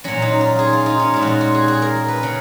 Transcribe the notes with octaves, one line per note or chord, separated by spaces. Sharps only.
A#2 F#3 C#4
D#4
F4
G#4
F4
D#4
C#4
A#2 G#3 D#4
F4 F#4
F#4
G#4
G#4
A#4
B4
C#3